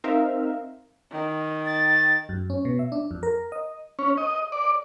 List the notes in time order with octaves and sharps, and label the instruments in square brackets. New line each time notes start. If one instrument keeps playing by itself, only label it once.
[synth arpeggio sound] C4 D#4 A#4 E5 F5
[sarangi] D#3
[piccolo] A6
[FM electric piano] F#2
C#4
B2
E5
D4
F2
A#4
D#5
[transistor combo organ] C#4
D#5
D5